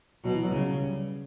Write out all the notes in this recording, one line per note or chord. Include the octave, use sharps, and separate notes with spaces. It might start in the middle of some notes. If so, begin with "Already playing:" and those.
B2 F#3
E3
F#3
C#3 G3
F#3
G3